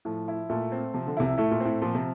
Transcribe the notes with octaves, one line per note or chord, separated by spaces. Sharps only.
A2 F3
E4
A#2 A3
C4
C3 F3
D3
C2 C3 E4
A2 A3
A#2
A2 C4
A#2 F3
C3